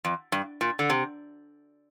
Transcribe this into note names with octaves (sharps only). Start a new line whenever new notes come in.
F2
G2
A#2
D3
C3